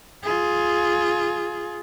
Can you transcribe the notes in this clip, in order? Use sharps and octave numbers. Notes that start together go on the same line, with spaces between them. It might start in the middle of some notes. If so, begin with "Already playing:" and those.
F4 G#4